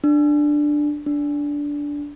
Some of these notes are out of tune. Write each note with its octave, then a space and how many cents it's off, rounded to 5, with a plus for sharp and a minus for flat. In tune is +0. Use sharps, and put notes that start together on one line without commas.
D4 +10
D4 -10